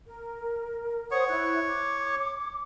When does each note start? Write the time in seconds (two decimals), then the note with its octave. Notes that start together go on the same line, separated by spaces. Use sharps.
0.06 A#4
1.11 C5 C#5 F#5 D#6
1.29 E4 C#6 F#6
1.67 D6